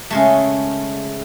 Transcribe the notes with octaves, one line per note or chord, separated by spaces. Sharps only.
C#3 G#3 A3